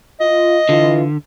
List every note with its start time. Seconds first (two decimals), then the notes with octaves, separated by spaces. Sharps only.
0.21 F4 D#5
0.69 D3 E3 F4